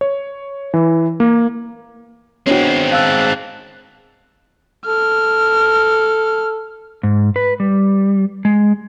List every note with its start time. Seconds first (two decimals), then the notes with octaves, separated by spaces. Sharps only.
0.01 C#5
0.74 E3
1.20 A#3
2.47 G#3 B3 C4 D4 F#4 C#5
2.92 F5 A5 E6 F#6
4.87 A4 F6
7.03 G#2
7.36 B4
7.60 G3
8.45 G#3